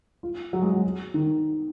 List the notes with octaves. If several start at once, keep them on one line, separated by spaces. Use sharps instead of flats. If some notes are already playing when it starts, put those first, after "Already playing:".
F4
F#3
G#3
F#3
D#3